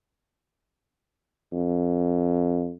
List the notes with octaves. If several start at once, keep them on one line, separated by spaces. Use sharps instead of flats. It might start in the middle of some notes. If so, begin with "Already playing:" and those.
F2